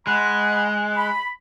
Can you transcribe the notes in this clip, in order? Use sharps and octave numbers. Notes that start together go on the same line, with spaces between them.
G#3 D#5 F#5 B5 F#6
B5